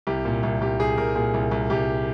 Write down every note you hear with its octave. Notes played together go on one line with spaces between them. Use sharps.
C2 G4
A#2
C2
C2 G4
C2 G#4
C2 A#4
A#2 G#4
C2
C2
C2 G4